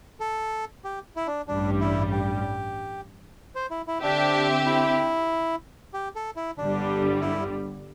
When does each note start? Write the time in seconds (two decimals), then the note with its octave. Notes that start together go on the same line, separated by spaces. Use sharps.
0.20 A4
0.84 G4
1.16 E4
1.27 D4
1.48 A1 G2 G3 D4
1.80 E4
2.12 G4
3.55 C5
3.71 E4
3.87 E4
4.03 D3 C4 D4 G4 E5
4.66 E4
5.94 G4
6.16 A4
6.36 E4
6.58 G1 G2 D3 G3 D4
7.21 E4